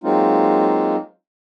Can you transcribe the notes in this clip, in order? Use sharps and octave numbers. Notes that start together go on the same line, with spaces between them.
F#3 G#3 A#3 C4 D#4 F4